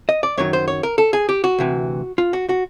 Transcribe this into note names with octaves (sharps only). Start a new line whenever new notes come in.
D#5
D5
F#2 D#3 F#3 C#5
C5
C#5
A#4
A4
G#4
G4
F#4
D2 C3 E3
F4
F#4
F#4